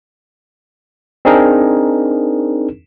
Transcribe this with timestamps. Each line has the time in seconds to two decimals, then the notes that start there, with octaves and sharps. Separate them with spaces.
1.25 C4 D4 D#4 G#4 A#4